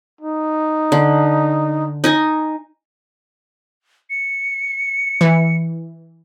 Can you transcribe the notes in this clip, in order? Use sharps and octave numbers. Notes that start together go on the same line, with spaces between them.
D#4
D3
D#4 D#5 G#5
C#7
E3